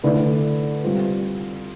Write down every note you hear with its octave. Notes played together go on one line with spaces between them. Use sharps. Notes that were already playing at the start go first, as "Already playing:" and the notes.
D3 A3 E4 B4 D5
G3 C4 F4